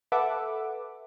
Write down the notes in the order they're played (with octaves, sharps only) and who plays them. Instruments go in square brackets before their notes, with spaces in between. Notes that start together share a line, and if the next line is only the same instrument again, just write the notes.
[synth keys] A4 B4 E5 F#5 D6